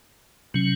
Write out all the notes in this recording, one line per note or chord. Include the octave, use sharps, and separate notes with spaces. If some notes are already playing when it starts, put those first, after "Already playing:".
C3 F#3 C#4